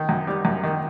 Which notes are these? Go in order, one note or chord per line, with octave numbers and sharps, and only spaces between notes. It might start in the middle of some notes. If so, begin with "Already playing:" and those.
Already playing: D#3
F#2
G3
F#2
D#3